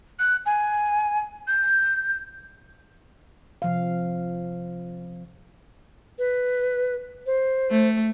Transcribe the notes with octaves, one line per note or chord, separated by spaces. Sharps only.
F#6
G#5
G6
C3 F3 F5
B4
C5
A3